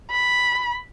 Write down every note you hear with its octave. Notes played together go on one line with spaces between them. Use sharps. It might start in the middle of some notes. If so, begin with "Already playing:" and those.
B5